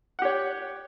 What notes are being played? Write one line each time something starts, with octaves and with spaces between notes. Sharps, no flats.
G4 C#5 F#5